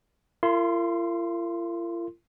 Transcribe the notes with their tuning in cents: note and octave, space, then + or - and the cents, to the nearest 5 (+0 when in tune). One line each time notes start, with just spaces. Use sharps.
F4 -45 A#4 -35 C6 +0